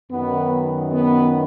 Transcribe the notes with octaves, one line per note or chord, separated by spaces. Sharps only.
F#2 D#3 B3
B3